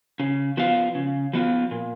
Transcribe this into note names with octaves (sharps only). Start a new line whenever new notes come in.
C#3
F3 B3 F4
C#3
F3 B3 F4
A#2